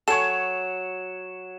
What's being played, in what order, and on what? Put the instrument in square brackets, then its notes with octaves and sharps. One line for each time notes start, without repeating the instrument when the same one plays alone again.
[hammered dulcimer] F#3 C#5 [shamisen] A4 [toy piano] F#5 G#5 C#6 [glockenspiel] E7